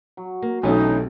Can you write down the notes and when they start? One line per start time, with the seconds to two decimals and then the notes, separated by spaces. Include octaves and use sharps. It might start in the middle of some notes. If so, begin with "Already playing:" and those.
0.17 F#3
0.42 A#3
0.63 B1 C3 E3 A3 C#4 D#4